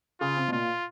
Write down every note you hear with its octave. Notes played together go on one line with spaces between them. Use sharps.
C#3 F4
C3
B2
A#2 F4